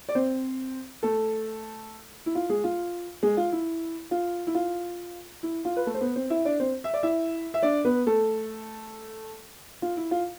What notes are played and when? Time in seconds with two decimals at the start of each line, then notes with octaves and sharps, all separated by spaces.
0.09 D5
0.15 C4 C5
1.03 A3 A4
2.26 E4
2.35 F4
2.49 G#3 G#4
2.64 F4
3.23 G#3 G#4
3.37 F4
3.52 E4
4.11 F4
4.47 E4
4.55 F4
5.43 E4
5.65 F4
5.77 B4
5.86 A3 A4
5.94 C5
6.01 B3 B4
6.16 C4 C5
6.30 E4 E5
6.45 D4 D5
6.60 C4 C5
6.84 E5
6.94 D5
7.03 E4 E5
7.54 E5
7.63 D4 D5
7.85 B3 B4
8.06 A3 A4
9.82 F4
9.97 E4
10.11 F4